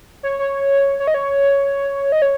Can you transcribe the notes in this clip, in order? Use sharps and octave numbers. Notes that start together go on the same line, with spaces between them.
C#5
C#5
C#5
D#5
C#5
D#5
C#5